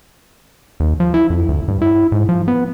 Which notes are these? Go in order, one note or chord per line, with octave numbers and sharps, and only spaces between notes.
D#2
F3
E4
F2
D2
G2
E4
G#2
F3
B3